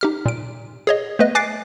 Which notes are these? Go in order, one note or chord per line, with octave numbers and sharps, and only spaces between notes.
D#4 G4 F6
A#2 D7
G#4 C#5 D#5
A3 B3 B4 D#5
G#5 D6 F#6 A6 C7 D7